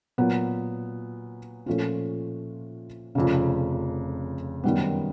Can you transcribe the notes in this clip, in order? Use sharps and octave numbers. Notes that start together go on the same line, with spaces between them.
A#2 F#3 B3
A#2 F3 A3 C#4 F4
F1 F2 C#3
F#2 D#3 G3 B3